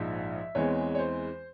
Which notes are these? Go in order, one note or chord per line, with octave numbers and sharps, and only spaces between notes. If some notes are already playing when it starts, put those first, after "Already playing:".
Already playing: A#1 G#2 F3 E5
E2 E3 G#3 C4 C#5
C#5
C5